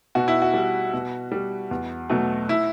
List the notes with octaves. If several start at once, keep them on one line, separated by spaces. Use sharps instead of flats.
B2 F#4
E4
F#4
G3
B2
G3
E2
B2 F#3 A3
E4